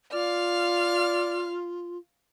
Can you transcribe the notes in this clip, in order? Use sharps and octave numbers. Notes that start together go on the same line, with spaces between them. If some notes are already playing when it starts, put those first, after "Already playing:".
F4 D5 F5 F6